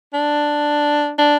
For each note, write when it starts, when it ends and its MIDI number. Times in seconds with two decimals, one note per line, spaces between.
0.14 1.12 62
1.19 1.37 62